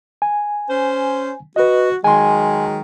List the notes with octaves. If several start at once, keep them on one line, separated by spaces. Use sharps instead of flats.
G#5
C#4 C5
F#4 B4 D#5
D#3 F#3 G#3 G#5 C6